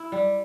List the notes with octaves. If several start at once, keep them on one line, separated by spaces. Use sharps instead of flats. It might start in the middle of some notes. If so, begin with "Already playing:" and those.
Already playing: E4
G3